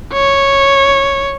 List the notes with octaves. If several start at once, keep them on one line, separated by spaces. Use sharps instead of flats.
C#5